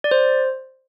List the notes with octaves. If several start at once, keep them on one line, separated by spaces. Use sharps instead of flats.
D5
C5